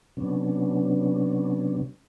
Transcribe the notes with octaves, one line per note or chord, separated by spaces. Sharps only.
C3 F#3 B3 C#4 D4